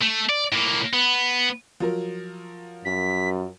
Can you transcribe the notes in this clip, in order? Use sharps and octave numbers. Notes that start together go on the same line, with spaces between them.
A3
D5
A2 A#3
B3
F3 F#3 A#4
F#2 B6